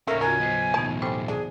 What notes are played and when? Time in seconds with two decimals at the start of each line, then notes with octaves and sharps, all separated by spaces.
0.08 D#2 A2 C#3 A3 A#3 C#4 D#4 A#4
0.21 F4 F#4 A#4 G#5
0.40 F#3 B3 C5 D#5
0.74 B1 A2 E3 B3 D#4 A5
1.02 G3 A3 C4 C5 G#5
1.28 D4 G#4 G#5